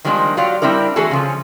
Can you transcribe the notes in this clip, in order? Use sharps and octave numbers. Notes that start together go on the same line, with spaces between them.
D#3 F3 G3 G#3 A#3 D4
F#3 F4 G4 D5 F5
G3 C4 D4 E4 A#4
E3 A3 F#4 G#4 A4
C#3 F3 C#4